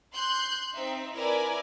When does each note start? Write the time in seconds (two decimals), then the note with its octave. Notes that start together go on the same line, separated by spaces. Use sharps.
0.13 C6 F#6 G6
0.75 C4 D#4 E5
1.15 E4 A#4 B4 D5 G#5